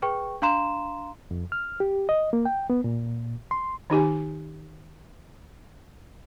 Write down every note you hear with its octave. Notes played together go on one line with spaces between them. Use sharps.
G#4 B4 G5 C#6
D4 F5 A#5 C6 E7
F2
F6
G4
D#5
A#3
G5
B3
A#2
C6
D#3 D#4 G4 G#5